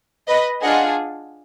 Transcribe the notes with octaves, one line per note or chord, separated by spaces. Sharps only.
B4 D#5
D4 F4 G#4 D#5 F#5